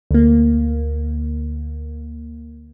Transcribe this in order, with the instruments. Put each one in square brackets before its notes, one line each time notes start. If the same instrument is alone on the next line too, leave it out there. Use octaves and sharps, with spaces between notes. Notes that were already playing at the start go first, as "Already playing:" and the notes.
[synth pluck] D2 A#3